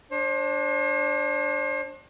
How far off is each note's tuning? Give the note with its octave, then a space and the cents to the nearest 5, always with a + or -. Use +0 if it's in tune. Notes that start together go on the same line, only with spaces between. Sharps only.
D4 +0 C5 +40